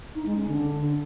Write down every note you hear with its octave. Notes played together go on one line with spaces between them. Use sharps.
D#4
G#3
C#4
D3